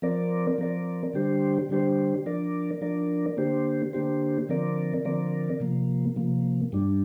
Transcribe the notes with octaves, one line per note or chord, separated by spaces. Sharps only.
F3 C4 A#4 D5
F3 C4 A#4 D5
D3 G3 D4 G4 C5
D3 G3 D4 G4 C5
F3 D4 A#4 D5
F3 D4 A#4 D5
D3 A#3 D4 G4 C5
D3 A#3 D4 G4 C5
D3 F3 C4 A#4 D5
D3 F3 C4 A#4 D5
C3 F3 A#3
C3 F3 A#3
G2 G3 D4